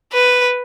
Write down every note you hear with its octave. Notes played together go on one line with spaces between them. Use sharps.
B4